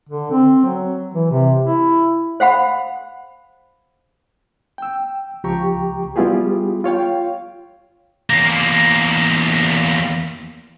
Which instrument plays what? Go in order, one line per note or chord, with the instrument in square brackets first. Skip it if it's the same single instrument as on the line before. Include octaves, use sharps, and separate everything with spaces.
[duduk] D3
C4
F#3
E3
C3
E4
[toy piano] C5 F5 F#5 B5
[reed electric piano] G5 E6
C#2 F3 G4 G5 A#5 C#6
G3 B3 E4 F4 G4 G#4
F4 C#5 F5 G5
[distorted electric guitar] E2 A#3